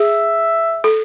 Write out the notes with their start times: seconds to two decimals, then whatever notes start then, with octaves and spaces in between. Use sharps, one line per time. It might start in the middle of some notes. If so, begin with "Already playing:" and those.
Already playing: G#4 E5
0.84 A4